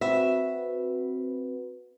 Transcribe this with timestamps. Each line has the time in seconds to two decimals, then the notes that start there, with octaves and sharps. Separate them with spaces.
0.01 C4 F#4 B4 E5